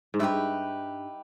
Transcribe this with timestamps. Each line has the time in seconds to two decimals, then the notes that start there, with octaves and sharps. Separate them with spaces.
0.14 G#2
0.19 G2 D#4 G4 B4 E5